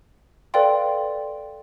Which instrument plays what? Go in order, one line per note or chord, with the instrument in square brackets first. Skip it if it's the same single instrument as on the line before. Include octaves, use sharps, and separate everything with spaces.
[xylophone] A4 B4 D5 F5 G5 C6